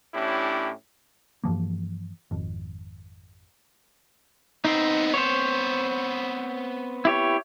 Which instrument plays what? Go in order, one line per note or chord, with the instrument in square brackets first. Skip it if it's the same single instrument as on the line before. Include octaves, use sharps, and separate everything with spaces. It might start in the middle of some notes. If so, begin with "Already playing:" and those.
[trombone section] A2 C#4 D4 E4 G4
[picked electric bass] G2 E3 F3 A#3
G#1 F2
[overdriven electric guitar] B3 C4 [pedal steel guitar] D#4
[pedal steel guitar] C5 C#5
E4 G4 C#5